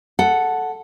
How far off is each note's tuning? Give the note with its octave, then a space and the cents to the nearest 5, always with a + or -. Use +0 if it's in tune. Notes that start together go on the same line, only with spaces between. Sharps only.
A4 +0 F#5 +0